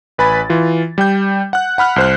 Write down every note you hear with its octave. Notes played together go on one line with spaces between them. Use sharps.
A1 B4 G#5 B5 A6
E3 F4
G3 G5 G6
F#5 F#6
F#5 B5 F6 F#6
C2 C5 F#6